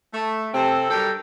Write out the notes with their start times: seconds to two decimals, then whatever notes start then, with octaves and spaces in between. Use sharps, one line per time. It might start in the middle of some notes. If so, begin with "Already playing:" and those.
0.14 A3
0.54 C3 C4 A4
0.90 G2 F#3 G3 A4 A#4 G5